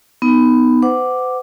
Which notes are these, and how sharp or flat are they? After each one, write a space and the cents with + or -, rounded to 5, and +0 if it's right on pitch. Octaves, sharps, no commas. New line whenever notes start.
B3 +10 D#4 +0
C5 -45 F#5 +0 D6 +0